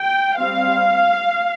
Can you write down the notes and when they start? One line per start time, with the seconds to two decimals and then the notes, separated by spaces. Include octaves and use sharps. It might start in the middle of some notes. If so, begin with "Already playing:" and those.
Already playing: G5
0.39 G3 C4 F5